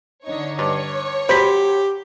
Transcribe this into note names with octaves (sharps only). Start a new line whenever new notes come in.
D3 D#4 C#5
G2 C#5
F#3 G4 C5 B5 C6 B6